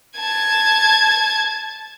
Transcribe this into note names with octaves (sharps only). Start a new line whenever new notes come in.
A5 G#6